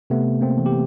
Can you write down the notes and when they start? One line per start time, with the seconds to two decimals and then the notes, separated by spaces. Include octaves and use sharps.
0.10 C3 A3 B3
0.41 A#3 C4
0.58 E3
0.66 G4